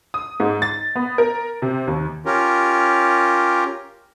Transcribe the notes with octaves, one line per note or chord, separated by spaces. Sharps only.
D#6
G#2
A6
B3
A#4
C3
D#2
C#4 F4 G4 A#4